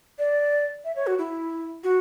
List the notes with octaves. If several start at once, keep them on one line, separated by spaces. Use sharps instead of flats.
D5
E5
C#5
F#4
E4
F#4